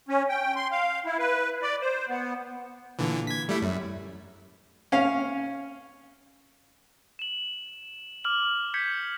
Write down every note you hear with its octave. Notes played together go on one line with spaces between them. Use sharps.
C#4
G5
C6
F5
E4
B4
D5
C5
B3
A#2 D3 E3
G#6 B6
G3 A3 E4
F#2
C#4 F5
E7 F#7
D6 F6 F#7
G6 G#6 B6 C#7